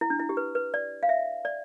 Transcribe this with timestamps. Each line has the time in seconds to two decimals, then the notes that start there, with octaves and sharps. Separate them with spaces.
0.01 E4
0.10 D4
0.19 E4
0.29 G4
0.37 B4
0.55 B4
0.74 D5
1.03 F5
1.09 E5
1.45 D5